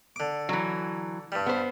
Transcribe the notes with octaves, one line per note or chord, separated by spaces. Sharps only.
D3 D6
E3 F#3
G2 G3
B3 C5